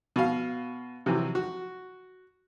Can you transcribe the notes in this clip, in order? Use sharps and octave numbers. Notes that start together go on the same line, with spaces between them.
B2 F5
C3 E3 F#3
F#4